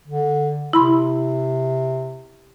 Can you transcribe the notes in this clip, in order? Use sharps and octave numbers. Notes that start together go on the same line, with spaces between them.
D3
C3 E4 B5 C6